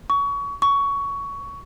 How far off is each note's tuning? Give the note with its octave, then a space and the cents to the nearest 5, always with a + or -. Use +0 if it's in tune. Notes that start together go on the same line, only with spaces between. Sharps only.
C#6 +25
C#6 +15